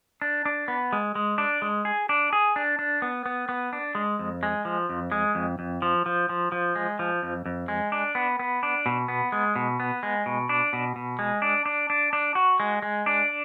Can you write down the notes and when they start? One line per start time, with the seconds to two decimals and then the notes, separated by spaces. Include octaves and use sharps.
0.22 D4
0.45 D4
0.68 B3
0.93 G#3
1.15 G#3
1.38 D4
1.62 G#3
1.85 G#4
2.09 D4
2.33 G#4
2.56 D4
2.79 D4
3.02 B3
3.26 B3
3.49 B3
3.73 D4
3.95 G#3
4.19 F2
4.43 G#3
4.65 F3
4.89 F2
5.12 G#3
5.35 F2
5.59 F2
5.82 F3
6.06 F3
6.29 F3
6.52 F3
6.76 G#3
6.99 F3
7.23 F2
7.46 F2
7.68 G#3
7.92 D4
8.15 B3
8.39 B3
8.63 D4
8.86 B2
9.08 B3
9.32 G#3
9.56 B2
9.80 B3
10.03 G#3
10.26 B2
10.49 D4
10.73 B2
10.96 B2
11.19 G#3
11.42 D4
11.66 D4
11.90 D4
12.13 D4
12.35 F#4
12.60 G#3
12.82 G#3
13.06 D4